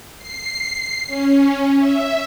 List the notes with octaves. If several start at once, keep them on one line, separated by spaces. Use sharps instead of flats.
C7
C#4
E5